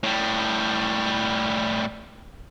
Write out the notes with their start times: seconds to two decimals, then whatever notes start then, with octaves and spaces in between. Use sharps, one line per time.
0.03 A2 G3